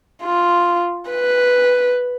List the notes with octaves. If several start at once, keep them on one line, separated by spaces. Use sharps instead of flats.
F4
B4